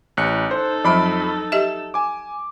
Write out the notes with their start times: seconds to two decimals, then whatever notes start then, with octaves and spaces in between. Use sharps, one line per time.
0.17 A1 F#6 C#7
0.51 D#4 A4 C5
0.85 F2 F3 F#3 B5 D7
1.52 G4 D#5 E5 E7
1.94 G#5 D6